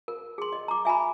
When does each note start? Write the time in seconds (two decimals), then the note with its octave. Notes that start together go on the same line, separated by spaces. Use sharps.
0.08 A#4
0.38 G#4 C6
0.53 D#5
0.68 A#5 D6
0.85 E5 G#5 A#5 B5